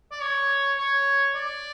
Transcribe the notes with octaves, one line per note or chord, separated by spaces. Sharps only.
D5
C#5
C#5
D5